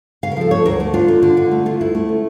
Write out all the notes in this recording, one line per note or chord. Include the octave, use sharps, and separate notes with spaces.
C#3 F5
A#4
F3 A4
A3 C#5
D2 A#4
A3
D4 F4
D3
D3
D3
A3
E4 F4
D2 E4
A3
C#4